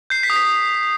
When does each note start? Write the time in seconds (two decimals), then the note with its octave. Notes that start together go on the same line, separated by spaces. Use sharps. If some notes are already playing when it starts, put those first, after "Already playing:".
0.10 G6 C7
0.23 B6
0.30 D#6
0.36 B6